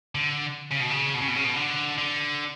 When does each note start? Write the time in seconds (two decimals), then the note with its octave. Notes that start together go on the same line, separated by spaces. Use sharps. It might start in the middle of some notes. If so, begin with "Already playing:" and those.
0.15 D3
0.71 C#3
0.80 B2
0.90 C#3
1.14 B2
1.22 C#3
1.28 B2
1.36 C#3
1.44 B2
1.56 D3
1.98 D3